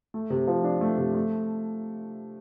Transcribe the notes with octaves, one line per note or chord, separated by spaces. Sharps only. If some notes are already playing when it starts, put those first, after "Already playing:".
A3
C3
F3
D4
A3
C3
A3